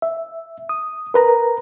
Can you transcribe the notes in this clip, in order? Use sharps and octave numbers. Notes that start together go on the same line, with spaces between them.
E5
D#6
A#4 B4 A#5